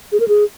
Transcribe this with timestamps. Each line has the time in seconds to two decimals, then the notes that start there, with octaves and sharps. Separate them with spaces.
0.12 G#4
0.20 A#4
0.28 G#4